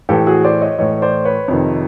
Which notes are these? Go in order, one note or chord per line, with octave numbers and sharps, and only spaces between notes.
A2 E3 G4 A4
F#4 G#4
C5 D5
C#5 D#5
A2 E3 C#5 D#5
C5 D5
B4 C#5
F2 C3 D#3